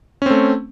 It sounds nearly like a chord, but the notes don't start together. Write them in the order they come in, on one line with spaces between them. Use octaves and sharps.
C#4 C4 A3